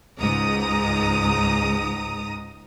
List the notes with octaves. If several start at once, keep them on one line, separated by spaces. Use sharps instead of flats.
C#2 G#2 A#5 D#6